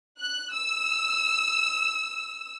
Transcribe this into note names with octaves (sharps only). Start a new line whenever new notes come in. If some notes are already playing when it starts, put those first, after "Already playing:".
F#6
E6